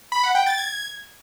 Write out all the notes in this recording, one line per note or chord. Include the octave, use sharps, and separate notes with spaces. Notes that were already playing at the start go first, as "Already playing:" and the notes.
B5
F#5
G5
A6
G#6